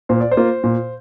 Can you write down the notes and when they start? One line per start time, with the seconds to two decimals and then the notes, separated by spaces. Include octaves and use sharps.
0.09 A#2 C5
0.20 D5
0.31 C5
0.37 A#3 F4
0.64 A#2